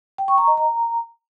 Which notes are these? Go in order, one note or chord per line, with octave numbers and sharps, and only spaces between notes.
G5
C#6
A#5
D#5
A#5